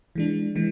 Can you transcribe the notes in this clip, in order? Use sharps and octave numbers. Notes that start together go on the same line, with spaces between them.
E3 G#3 D4
E3 G#3